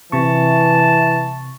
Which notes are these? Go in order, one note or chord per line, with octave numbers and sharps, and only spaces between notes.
C3 E3 A5 C#6